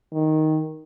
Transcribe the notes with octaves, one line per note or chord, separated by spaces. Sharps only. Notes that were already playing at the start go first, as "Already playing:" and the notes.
D#3